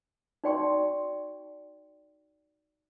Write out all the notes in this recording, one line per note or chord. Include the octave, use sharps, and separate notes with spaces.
D#4 F#4 D5 G5 C6 C#6